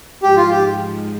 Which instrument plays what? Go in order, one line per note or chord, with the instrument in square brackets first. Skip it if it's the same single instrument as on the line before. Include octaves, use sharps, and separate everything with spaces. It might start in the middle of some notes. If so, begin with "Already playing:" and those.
[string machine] G#2 F3 G#3 [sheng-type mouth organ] G4
[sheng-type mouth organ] F4
G4